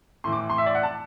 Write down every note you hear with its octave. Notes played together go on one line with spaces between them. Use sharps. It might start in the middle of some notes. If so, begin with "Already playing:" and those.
A2 E3 C6
D6
C6
E5
D5
F#5
A5